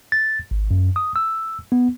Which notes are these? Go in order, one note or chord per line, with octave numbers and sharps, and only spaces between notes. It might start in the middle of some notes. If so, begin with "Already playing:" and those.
A6
G#1
F#2
D#6
E6
B3